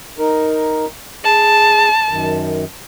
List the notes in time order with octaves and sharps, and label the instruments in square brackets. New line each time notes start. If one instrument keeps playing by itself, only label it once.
[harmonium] D#4 A#4
[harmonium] G#4 [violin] A5
[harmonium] F#2 D#3